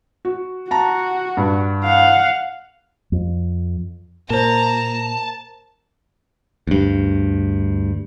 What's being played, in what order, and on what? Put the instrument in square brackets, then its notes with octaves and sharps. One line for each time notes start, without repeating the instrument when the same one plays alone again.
[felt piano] F#4
[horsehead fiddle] F#4 [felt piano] A5 A#5
[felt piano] G2
[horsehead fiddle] F5 F#5
[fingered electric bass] F2
[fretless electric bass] A#2 [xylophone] A#4 C5 [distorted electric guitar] A5 [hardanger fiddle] A#5
[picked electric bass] D2 G2